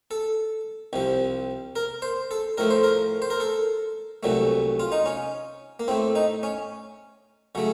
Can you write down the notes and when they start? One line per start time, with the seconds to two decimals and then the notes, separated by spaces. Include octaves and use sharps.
0.11 A4
0.93 C2 C3 F3
1.76 A#4
2.02 C5
2.31 A4
2.58 A2 F3 A3 A#4
2.70 C5
2.83 A#4
3.22 C5
3.30 A#4
3.40 A4
4.23 C2 A#2 F#3 A3
4.80 F4
4.92 D#4
5.06 C#4
5.80 A#3
5.88 A2 A3 C4
6.15 D#4
6.43 C#4
7.55 C#3 F#3 A3